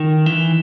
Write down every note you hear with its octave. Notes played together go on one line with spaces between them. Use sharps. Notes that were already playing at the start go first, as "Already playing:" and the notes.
Already playing: D#3
E3